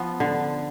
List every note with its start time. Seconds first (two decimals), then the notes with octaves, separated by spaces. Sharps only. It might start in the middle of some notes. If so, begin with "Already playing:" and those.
Already playing: F3 B3
0.20 D3